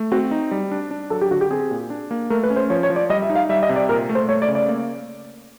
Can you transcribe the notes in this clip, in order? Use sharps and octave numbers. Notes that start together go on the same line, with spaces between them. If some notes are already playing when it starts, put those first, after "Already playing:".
Already playing: A3
C4 F#4
D#4
G3
D4
D4
F#3 A4
G4
D3 F#4
G4
C4 G#4
A#2
D4
A#3
A3 A#4
B4
C#4
C5
F3 C#5
C#5
F3
D5
G3 D#5
E5
D#4
F5
G3 E5
D#5
C3
D5
A#2 A#4
A3
C5
A3 C#5
D5
C#3
D5
A#3